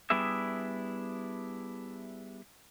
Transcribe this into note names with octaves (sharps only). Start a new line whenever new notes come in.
G3 B3 D4 E4 G#4 E5